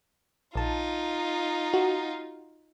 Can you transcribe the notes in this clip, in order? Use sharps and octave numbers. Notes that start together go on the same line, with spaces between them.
A#1 D#4 F4 A5
F#4